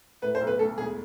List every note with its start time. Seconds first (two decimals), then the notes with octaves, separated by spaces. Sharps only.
0.22 A2 B4
0.35 C5
0.41 B1
0.47 B4
0.59 D2 A4
0.78 E1 G#4